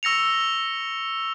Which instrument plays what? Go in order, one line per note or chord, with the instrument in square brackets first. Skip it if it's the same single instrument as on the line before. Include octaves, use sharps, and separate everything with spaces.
[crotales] C#6 E6 A#6 C#7 F7